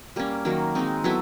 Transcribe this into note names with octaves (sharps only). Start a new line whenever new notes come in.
G3 A#3 C#4
D#3 F#3 A#3
G#3 C4 D#4
F#3 B3 E4 A4